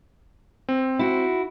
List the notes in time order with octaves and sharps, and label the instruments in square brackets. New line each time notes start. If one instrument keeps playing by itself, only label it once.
[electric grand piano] C4
[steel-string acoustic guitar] E4 F#4